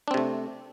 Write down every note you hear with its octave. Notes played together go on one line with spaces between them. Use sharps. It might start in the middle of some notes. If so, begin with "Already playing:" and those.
C3 A3 C4 D4